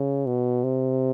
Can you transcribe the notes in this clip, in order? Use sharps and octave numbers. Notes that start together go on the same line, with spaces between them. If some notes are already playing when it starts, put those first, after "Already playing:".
Already playing: C#3
B2
C3